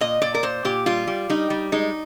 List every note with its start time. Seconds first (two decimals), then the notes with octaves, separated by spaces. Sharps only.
0.01 A#2 D#5
0.22 A#2 D5
0.34 A#4
0.43 A#2 C5
0.65 A#2 G4
0.86 G3 F4
1.07 G3
1.30 G3 D#4
1.50 G3
1.72 G#3 D#4